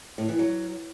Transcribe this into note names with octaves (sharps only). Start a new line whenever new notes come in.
A2
E3
F#3